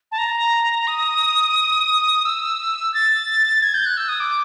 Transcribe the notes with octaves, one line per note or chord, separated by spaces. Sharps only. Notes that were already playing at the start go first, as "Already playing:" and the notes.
A5
A#5
D#6
E6
A6
G#6
G6
F#6
E6
D#6
D6